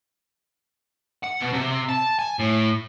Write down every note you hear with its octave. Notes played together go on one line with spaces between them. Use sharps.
F#5
B2
C3
A5
G#5
A2